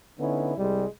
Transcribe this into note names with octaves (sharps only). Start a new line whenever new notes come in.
D3 B3 C#4 D#4 E4
C2 G3 G#3